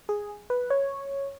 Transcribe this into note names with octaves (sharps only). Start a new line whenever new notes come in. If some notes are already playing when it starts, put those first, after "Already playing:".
G#4
B4
C#5